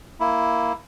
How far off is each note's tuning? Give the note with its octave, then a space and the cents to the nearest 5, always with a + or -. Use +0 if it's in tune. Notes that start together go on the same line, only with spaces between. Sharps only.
A#3 +0 E4 +5